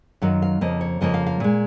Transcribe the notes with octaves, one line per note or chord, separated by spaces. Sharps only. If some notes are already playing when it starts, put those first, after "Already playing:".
F#2 D#3 F#3 F5
F5
F2 C#3 F3 A#3 D#5
C#5
F2 C#3 F3 A#3 D#5
F5
F5
A#2 G#3